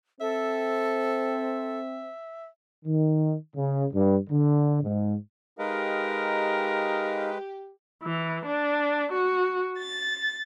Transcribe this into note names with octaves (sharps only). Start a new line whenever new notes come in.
C4 A4 E5
D#3
C#3
G2
D3
G#2
G#3 D#4 G4 A#4 B4 D#5 F5
E3
D4
F#4
A6